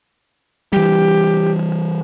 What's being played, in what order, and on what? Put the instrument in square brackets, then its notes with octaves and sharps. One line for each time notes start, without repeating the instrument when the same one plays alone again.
[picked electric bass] E3 G3 [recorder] G4